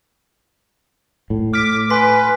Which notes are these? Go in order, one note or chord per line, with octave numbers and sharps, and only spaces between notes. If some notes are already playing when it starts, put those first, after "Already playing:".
A2
D6 F6 B6
B4 G#5 C6 B6